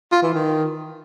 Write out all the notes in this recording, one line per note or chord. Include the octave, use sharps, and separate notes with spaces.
F4
E3
D#3